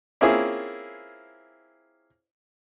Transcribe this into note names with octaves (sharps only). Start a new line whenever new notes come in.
A#3 C4 C#4 E4 F4 G#4